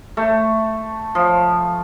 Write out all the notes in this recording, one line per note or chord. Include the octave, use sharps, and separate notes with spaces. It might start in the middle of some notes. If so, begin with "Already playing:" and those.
A3
F3